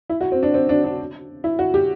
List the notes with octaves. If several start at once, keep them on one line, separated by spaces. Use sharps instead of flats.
E4
F#4
C4
D4
C4
D4
D4
E4
F#4
G4